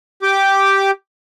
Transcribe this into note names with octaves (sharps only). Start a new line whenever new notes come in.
G4 D6